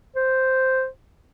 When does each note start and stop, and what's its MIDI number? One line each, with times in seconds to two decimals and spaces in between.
0.16 0.87 72